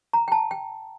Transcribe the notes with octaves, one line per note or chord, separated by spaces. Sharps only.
A#5
G5
A5
G5